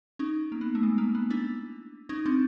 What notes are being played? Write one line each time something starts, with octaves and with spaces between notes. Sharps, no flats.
C#4 D#4
A#3
B3
A3
G#3
A#3
B3
D4 E4
C#4 D#4
C4 D4